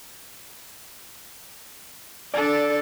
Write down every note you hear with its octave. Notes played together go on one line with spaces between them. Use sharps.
D4 A4 D5